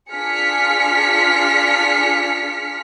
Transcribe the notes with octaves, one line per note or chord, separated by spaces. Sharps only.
D4 F4 G#4 F6 B6 C#7